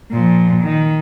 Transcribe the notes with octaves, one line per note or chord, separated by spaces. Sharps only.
A#2 F3
D#3